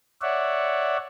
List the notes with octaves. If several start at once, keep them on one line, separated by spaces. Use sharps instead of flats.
C#5 D5 E5 F#5